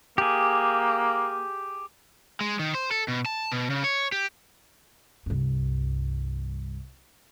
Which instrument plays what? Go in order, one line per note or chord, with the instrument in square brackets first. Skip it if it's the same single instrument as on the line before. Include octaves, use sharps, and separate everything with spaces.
[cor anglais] A#3 [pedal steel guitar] G4 G#4
[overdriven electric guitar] G#3
D#3
C5
A4
B2
A5
B2
C#3
C#5
G4
[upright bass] C2 G2